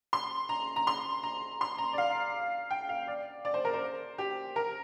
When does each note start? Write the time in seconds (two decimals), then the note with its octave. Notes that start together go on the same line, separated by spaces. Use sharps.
0.13 C6
0.49 A#5
0.76 A#5
0.87 C6
1.23 A#5
1.61 C6
1.78 A#5
1.93 D5
1.98 F5
2.71 G5
2.89 F5
3.07 D5
3.45 D5
3.54 C5
3.65 A#4
3.74 C5
4.18 G4
4.56 A#4